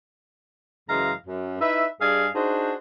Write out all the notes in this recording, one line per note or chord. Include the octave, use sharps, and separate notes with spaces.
F#2 C#3 E3 G#3 F5 A#5
F#2
D#4 E4 B4 E5
G2 G#4 D5 D#5 F5 G#5
D4 D#4 F#4 G#4 C5